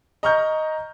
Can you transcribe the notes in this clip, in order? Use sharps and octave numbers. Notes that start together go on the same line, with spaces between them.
D#5 A#5 C#6 F6 G6